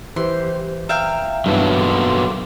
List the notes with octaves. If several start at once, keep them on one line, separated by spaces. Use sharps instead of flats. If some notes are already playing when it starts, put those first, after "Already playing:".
E3 G4 C5 C6
E5 F5 G5 A#5
G2 E3 F#3 A#3 B3 A5
A4 C6 D6